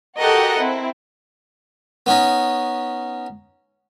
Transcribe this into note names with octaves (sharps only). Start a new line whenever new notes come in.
F#4 G4 A4 A#4 D#5 F#5
C4 E4
B3 C#4 D#4